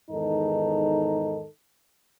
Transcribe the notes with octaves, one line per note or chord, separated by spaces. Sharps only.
E2 G#2 D#3 D#4 A4